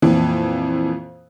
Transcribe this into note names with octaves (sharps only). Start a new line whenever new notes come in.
F2 A#2 E3